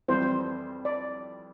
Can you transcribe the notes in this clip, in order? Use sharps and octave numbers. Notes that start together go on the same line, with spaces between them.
F2 E3 G3 C4 C5
D5